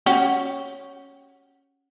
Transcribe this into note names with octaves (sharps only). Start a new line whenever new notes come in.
C#4 F#4 G4